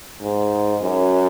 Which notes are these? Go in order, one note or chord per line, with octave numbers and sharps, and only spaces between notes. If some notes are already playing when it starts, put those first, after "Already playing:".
G#2
F#2